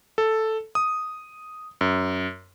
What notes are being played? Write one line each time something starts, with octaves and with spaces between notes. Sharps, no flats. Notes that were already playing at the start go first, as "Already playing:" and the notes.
A4
D#6
F#2